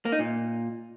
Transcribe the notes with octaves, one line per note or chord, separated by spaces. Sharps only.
A#3
D#4
A#2